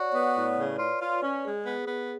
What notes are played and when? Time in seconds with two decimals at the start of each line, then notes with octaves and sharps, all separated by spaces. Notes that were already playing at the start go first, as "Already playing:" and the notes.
Already playing: F#4 C#5 D5
0.10 C#5
0.15 B3 B4
0.36 A2
0.58 C#3
0.79 F4
1.01 F4
1.23 C#4
1.44 G#3 G#4
1.66 B3
1.88 B3